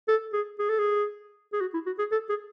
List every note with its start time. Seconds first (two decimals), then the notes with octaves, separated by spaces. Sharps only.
0.08 A4
0.33 G#4
0.59 G#4
0.69 A4
0.78 G#4
1.53 G#4
1.61 F#4
1.74 E4
1.86 F#4
1.99 G#4
2.12 A4
2.29 G#4